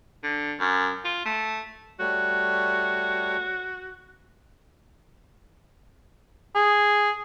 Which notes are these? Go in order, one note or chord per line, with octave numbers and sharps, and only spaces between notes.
D3
F#2
F4
A3
G3 A3 F#4 C#5
G#4